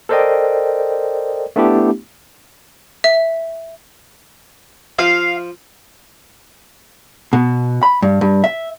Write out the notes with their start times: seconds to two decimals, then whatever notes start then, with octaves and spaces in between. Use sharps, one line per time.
0.09 A4 A#4 C5 D5 D#5 G5
1.56 A3 B3 D4 E4 G4
3.04 E5
4.99 F3 F5
7.33 B2
7.83 B5
8.02 G2
8.21 G2
8.44 E5